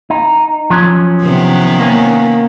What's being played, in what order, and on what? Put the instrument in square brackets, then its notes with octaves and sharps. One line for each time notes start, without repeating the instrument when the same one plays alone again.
[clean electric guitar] D#4
F3 F#3 C#4
[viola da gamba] C3 D#3 B3
[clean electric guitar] A#3 C#4